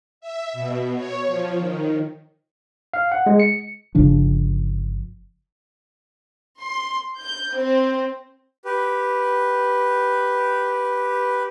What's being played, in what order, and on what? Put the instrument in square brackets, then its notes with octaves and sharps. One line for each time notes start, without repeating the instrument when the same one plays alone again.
[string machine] E5
B2
C#5
F3
D#3
[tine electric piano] F5
F#5
G#3
C#7
[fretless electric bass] G1 C#3 F3 D4
[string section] C6
G6
C4
[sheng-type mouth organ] G4 B4